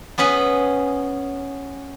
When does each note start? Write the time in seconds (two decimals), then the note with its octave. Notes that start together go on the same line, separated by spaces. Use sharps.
0.18 B3 C#4 G#4 B4